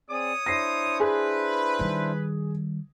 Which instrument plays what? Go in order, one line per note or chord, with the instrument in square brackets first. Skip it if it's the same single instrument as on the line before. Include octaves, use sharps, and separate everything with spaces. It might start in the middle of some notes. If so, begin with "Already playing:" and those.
[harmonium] C4 G#4 D5 [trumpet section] C#5 D#6
[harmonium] D4 E4 C5 [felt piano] A#6 C7
[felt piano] G#4 [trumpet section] B4
[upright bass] D#3 G3